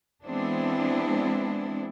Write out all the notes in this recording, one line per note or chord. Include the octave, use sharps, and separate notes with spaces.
E3 G#3 B3 C4 D4 E4